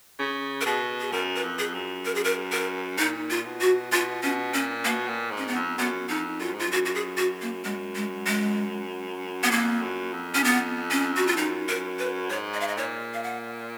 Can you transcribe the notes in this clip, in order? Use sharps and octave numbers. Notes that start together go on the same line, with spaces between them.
C#3
A#4
B2 G#4
G#4
F#2 A#4
B4
F2
G#4
F#2
A#4
G#4
A#4
A#4
A#2 D#4
F4
B2
F#4
B2 F4
B2 C#4
A#2 C#4
B2 A#3
A#2
G#2
C#4
B3
F2
F#2 B3
F2 D#4
F#2 F4
G#2
F4
F#2 F#4
F#4
G#4
F#4
A#3
F#2 G#3
G#3
G#3
B3
F2 A#3
F#2
F2
C#4
B3
C#4
F#4
F4
F#2 D#4
A#4
B4
G#2 C#5
D#5
F5
D#5
A#2 C#5
F5
F#5